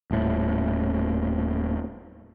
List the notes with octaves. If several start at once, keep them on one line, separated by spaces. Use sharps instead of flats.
D#1 A2